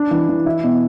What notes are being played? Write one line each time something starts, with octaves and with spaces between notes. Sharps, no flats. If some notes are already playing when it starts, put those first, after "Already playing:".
Already playing: D4
E3
E3
E4
B2